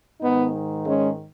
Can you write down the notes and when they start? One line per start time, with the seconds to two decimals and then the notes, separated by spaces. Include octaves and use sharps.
0.21 G#2 D#3 B3 D#4
0.85 G#3 C#4